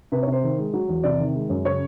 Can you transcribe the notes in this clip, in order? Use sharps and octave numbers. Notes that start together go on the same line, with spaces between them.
C3 B4
C#5
C3
C5
D#3
G#3
F#3
E2
C3 D5
D#3
G#3
F#2
C#3 C#5